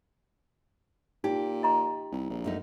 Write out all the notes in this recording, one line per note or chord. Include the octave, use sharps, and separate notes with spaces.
A#2 D#4 G4
D#5 A#5 C6
C2
A#1
F#2 A3 D#4